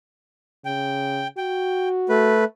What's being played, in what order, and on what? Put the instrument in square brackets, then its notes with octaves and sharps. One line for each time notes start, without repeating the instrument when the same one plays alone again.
[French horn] C#3 [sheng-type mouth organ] G5
[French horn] F#4 [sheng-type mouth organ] G5
[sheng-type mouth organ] A3 B4